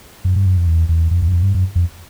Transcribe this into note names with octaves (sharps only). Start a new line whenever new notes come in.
F#2
G2
F#2
F2
E2
E2
F2
E2
F#2
F2
G2
F#2
F2